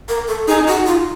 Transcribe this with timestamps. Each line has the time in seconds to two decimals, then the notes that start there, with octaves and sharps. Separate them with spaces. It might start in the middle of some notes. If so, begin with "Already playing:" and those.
0.08 A#4
0.28 A4
0.48 D#4 G#4
0.67 F#4
0.86 F4